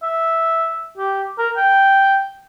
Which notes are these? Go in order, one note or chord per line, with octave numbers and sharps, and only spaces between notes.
E5
G4
A#4
G5